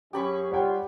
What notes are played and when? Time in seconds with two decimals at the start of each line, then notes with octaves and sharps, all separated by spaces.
0.13 F#2 C#4 G4 G#4 B5 C#6
0.51 G3 F4 C#5 F#5 G5